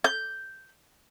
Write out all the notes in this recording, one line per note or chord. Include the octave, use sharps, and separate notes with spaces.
G6